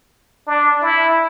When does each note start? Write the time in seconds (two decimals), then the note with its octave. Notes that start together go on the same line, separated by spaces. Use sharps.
0.47 D4
0.82 E4